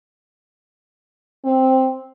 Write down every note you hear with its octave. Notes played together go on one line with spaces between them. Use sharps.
C4